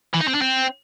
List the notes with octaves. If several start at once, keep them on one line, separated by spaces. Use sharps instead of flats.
E3
D#4
C4
D4
C4